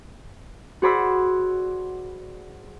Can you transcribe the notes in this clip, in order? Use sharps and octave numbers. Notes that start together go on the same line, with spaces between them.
F#4 G#4 C5 D5 B5 E6